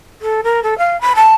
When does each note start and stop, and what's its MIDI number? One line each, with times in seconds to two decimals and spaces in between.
0.22 0.41 69
0.44 0.61 70
0.63 0.77 69
0.78 0.99 77
1.01 1.13 83
1.16 1.35 81